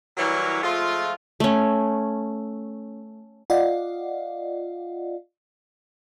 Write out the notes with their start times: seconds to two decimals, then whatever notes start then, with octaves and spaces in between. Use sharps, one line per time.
0.17 E3 F#3 G3 E4 A#4 C#5
0.62 F3 G#3 A3 F4
1.40 A3 C#4
3.50 F4 D5 D#5 F5 F#5